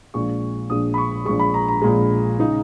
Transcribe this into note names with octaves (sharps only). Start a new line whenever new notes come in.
A#1 A#2 G#3 C#6
A#1 A#2 G#3 D#6
B5
C#6
A#1 A#2 G#3 C#6
B5
A#5
A#5
A#1 A#2 G#3
C#3 G#3 D#4